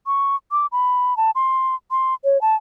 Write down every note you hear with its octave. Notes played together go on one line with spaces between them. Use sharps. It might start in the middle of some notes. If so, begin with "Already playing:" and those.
C#6
D6
B5
A5
C6
C6
C#5
A5